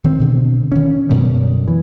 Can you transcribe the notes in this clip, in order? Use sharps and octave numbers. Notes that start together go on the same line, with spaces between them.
D#3 C4
B2 D3
D#3 C#4
F#2 B2 D3 G3
E3